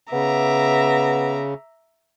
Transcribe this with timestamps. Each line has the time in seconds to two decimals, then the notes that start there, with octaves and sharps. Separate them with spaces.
0.13 C#3 B3 E5 A#5 D6